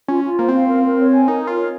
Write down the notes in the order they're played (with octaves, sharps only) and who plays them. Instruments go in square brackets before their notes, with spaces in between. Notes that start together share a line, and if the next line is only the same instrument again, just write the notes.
[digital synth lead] C#4 [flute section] F4
[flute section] F4
[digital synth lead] A#3 [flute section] C5
[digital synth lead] C4 [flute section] F5
[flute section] A#4
A#4
C#5
G#5
[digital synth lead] D#4 [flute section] A#4
[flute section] A#4
[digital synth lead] F4
[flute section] C#5